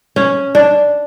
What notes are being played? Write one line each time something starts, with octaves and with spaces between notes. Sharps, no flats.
C#4
D4